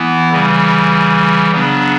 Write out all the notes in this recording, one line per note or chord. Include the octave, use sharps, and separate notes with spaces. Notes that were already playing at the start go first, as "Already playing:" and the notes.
Already playing: E3 B3 E4
C#3 E3 G3
C#3 F#3 B3 D4